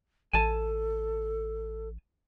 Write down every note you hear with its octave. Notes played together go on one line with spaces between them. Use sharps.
A1 A4 G#5 A5